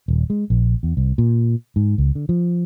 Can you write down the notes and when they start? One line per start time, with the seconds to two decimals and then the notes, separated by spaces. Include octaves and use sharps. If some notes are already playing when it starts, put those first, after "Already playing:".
0.08 D#1
0.30 G#3
0.50 A#1
0.83 E2
0.97 C2
1.18 A#2
1.76 G#2
1.98 C#2
2.15 D3
2.29 F3